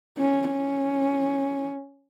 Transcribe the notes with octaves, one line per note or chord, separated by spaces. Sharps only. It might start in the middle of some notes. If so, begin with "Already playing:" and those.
C#4
C#4